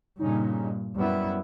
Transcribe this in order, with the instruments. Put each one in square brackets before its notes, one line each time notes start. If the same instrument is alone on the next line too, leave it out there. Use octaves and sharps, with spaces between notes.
[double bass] G2 A#2 [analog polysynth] C#3 C#4 D#4
[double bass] F#2 E4 [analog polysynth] G3 B3